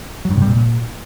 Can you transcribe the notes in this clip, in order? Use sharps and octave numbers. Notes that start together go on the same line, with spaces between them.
F#3
G2
C3
G3
A#2